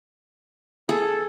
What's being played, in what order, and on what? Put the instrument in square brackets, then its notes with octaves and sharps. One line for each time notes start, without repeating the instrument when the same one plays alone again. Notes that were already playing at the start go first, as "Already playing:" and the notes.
[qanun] G#4 [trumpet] A4